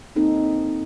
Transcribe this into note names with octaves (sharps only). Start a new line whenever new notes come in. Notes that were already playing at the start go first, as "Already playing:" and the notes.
A#3 C4 D#4 A4